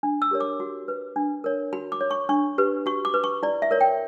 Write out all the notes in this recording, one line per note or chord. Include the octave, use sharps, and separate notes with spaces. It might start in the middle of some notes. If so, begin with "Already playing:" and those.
D4
E6
G4 A#4 C#5
D6
F#4
B4
D4
A#4 C#5
F#4 B5
D6
C#5
C#6
D4 C#6
G4 B4
F#4 C#6
D6
B4
C#6
E4 D5
E5
A#4 C#5
G5